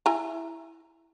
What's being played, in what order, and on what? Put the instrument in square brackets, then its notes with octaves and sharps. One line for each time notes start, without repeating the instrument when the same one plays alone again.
[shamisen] E4 G#5 A#5